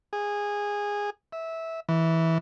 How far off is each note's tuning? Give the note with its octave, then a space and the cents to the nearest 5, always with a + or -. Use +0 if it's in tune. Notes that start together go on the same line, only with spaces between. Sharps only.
G#4 -15
E5 -15
E3 -15